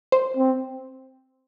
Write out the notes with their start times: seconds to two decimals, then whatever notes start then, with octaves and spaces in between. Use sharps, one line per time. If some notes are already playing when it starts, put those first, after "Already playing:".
0.12 C5
0.37 C4